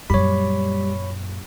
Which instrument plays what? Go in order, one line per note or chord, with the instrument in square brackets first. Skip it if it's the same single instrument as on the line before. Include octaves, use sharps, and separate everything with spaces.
[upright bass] F#2 A#2 [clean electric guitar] G3 [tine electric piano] C#5 B5